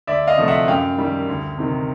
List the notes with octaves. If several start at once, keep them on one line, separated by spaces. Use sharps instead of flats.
D2 D5 E5
D#5 F5
C3 F3 A3
E5 F#5
F#2 F5 G5
D#3 G3
D2
C3 D#3